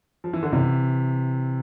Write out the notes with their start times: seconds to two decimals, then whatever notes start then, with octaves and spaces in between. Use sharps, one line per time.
0.24 F3
0.33 E3
0.43 D3
0.53 C3 E3